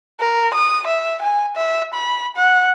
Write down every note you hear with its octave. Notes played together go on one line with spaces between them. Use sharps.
A#4
D#6
E5
G#5
E5
B5
F#5